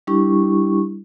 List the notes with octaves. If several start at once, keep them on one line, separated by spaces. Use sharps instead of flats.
G3 D4 E4 G4 C#6